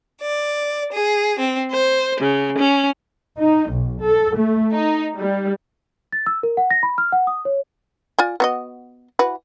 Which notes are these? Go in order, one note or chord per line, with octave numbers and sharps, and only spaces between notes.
D5
G#4
C4
C5
C#3
C#4
D#4
B1
A4
A3
D#4
G3
A6
E6
A#4
F#5
A#6
B5
F6
F#5
D#6
C#5
F4 D5 G#5
B3 F#4 D#5
E3 F#4 B4